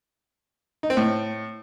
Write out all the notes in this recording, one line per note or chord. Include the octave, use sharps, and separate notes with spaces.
D#4
C4
A2